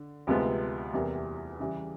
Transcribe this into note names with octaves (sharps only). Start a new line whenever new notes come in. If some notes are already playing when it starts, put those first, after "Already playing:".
Already playing: D3
D2 C3 F3 G#3 B3
E2 C3 E3 G3 A#3
C#3 E3 G3